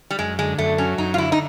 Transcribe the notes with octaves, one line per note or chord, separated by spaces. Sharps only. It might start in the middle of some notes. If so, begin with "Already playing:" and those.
G3
F#2 G#3
D3 G#3
F#2 A3
F#3 C#4
F#2 D#4
F4
D3 E4
D#4